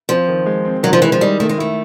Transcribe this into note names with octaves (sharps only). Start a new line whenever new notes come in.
F3 C4
D#3
G#3
C4
D#3 F#3
F3
E3 G#3
F3
G3 D#4
D#3 A3
G#3
A3 E4